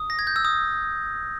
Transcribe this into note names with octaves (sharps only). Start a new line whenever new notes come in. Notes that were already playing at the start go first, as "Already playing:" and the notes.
Already playing: D#6
A#6
G#6
G6
E6
D#6